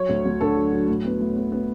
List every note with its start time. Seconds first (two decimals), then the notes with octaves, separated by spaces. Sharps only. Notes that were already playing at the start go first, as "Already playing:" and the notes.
Already playing: F#3 C#5
0.09 D2
0.25 D2
0.41 D3 A4
0.57 F#3
0.72 F#3
0.88 A2
1.05 B3
1.21 A2
1.36 B3
1.52 B3